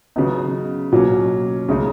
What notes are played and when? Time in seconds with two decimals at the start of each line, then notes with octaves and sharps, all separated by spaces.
0.16 C#3 F#3 B3 D#4
0.92 B2 F#3 A#3 C#4
1.69 C#3 G#3 D#4